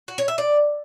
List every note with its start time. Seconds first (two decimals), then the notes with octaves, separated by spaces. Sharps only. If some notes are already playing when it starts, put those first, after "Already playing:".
0.08 F#4
0.18 C#5
0.28 E5
0.38 D5